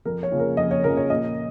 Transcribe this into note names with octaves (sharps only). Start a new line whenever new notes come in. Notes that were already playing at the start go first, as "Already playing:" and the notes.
F2 A#4
C#5
C#3 F3 A#3 C#4
A#4
F2 D#5
C#5
C#3 F3 A#3 C#4 A#4
C#5
A#2 D#5